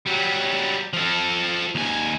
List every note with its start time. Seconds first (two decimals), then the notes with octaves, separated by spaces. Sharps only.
0.06 F#3 G3
0.93 F3 A4
1.75 D#2 G#5